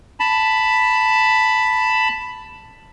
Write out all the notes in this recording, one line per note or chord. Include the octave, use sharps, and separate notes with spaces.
A5 B5